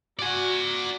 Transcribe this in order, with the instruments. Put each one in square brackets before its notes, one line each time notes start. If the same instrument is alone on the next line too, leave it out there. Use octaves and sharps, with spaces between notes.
[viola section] F#4 [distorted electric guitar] D5 G#5